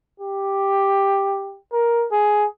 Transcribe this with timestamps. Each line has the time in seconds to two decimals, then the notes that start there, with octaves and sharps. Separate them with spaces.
0.20 G4
1.72 A#4
2.12 G#4